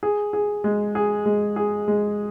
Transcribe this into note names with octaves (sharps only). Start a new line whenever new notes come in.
G#4
G#4
G#3
G#4
G#3
G#4
G#3